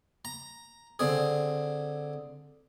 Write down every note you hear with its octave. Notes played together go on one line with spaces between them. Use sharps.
A#5
D3 C4 G#4